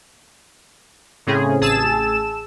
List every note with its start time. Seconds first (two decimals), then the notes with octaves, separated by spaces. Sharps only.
1.27 A2 C#3 C4 C#4 G#4
1.61 A1 G#4 A5 E6 E7